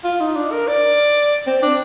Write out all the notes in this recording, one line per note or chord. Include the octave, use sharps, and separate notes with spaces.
F4
D#4
D4
A#4
D5
C4
D4